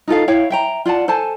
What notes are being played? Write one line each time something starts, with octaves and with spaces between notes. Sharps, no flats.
D#4 F4 A4 F5
E4 C#5 F5 G5
E5 G5 A#5
F4 D5 F#5 A5
A4 C5 G#5 A5